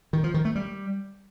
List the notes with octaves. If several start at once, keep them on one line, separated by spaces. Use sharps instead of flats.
D#3
F3
D#3
A3
G3